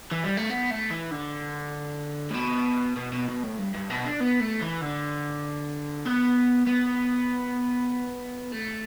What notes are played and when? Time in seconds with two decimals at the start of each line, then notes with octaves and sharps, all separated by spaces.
0.11 E3
0.24 G3
0.37 A3
0.50 B3
0.71 A3
0.91 E3
1.11 D3
2.31 A2
2.35 B2
2.97 B2
3.13 B2
3.28 B2
3.43 A2
3.58 G2
3.74 G2
3.90 B2
4.05 D4
4.20 B3
4.41 A3
4.62 E3
4.82 D3
6.06 B3
6.66 B3
8.52 A3